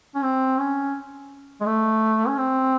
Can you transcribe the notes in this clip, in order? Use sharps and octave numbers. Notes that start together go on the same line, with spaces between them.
C#4
C4
C#4
G#3
A3
C#4
C4